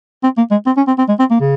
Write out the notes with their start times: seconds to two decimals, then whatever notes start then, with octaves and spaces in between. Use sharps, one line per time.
0.23 C4
0.37 A#3
0.51 G#3
0.66 C4
0.77 C#4
0.87 C4
0.98 C4
1.09 G#3
1.19 C4
1.31 A#3
1.40 C#3